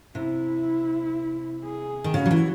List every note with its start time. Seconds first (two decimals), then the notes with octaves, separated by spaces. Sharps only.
0.15 C3 E4
1.64 G#4
2.04 D#3
2.14 C#3 F#4
2.26 F#3
2.31 E3